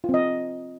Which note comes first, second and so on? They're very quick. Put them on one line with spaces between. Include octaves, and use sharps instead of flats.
F4 C4 D#5